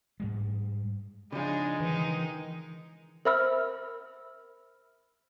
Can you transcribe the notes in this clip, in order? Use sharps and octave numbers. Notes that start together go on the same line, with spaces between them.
G#2 G3 G#3
C#3 F3 G#3 D4 D#4
D#3 E3 D#4
A#4 C5 E5 B5 E6 F6